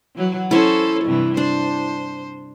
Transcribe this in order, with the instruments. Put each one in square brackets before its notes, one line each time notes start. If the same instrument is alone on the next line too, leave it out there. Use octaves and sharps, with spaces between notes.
[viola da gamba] E3 F#3 F#4
[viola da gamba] C#4 A4 C5 [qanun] E4 C#5
[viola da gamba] G2 C3 E3
[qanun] D4 [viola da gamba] C5